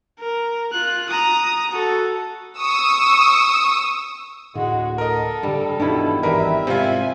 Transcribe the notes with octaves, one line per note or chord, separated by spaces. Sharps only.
A#4
F4 F#6
A#5 D#6
F#4 A4
C#6 D#6 E6
D2 A2 G#3 F#4
A4 A#4 D#5
G2 D3 G3
E1 G2 B2 D#3 D4 E4
G#1 E2 G3 A#4 B4 E5
G#2 C3 C4 F4 E5 G#5